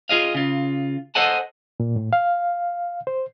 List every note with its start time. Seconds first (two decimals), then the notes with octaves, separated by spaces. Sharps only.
0.09 F4 G#4 D#5 F5
0.35 C#3 F4
1.15 A4 C5 D#5 F#5 G#5 A5
1.80 A#2
1.96 A2
2.13 F5
3.07 C5